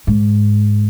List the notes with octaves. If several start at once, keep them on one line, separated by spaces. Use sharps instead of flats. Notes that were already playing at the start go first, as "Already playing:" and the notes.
G#2